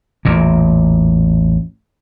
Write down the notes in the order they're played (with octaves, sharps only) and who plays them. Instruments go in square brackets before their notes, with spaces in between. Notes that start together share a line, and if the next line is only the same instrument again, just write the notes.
[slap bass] A1 E2 A#2